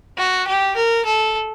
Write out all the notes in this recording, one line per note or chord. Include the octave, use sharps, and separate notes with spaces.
F#4
G4
A#4
A4